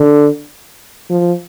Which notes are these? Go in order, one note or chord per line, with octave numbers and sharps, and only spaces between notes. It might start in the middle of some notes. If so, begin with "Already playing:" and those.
Already playing: D3
F3